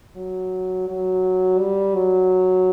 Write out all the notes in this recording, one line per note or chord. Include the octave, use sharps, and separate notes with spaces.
F#3
F#3
G3
F#3